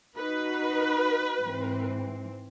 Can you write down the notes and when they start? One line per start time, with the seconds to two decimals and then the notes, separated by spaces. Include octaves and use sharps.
0.17 D#4 F#4 B4
1.39 G#2 E3 C4